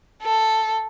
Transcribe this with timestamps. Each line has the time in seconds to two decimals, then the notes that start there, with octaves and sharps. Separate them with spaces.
0.22 A4